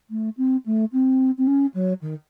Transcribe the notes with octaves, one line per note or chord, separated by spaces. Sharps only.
A3
C4
A3
C4
C4
C#4
F#3
D#3